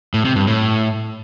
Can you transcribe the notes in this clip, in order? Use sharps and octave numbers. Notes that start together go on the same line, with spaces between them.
A2
C3
G2
A2